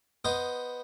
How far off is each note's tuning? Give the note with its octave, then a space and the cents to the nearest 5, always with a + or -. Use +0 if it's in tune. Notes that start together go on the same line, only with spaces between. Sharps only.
B3 +0 C5 +0 D#5 +0